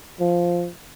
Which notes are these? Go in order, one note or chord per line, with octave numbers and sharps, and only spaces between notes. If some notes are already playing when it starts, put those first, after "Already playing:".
F3